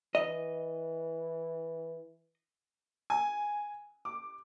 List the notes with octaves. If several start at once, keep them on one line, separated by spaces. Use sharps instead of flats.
E3 D#5
G#5
D6